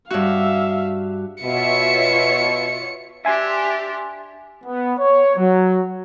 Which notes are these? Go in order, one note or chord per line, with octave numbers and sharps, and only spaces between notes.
G2 F#4 E5 F5
B2 F4 C#5 E5 C#7
D4 G4 E5 G#5 C6
B3
C#5
F#3